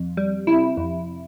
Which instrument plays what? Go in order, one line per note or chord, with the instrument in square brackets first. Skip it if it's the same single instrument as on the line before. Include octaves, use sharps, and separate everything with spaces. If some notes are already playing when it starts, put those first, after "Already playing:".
Already playing: [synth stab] F2
G3
C3 E4
F2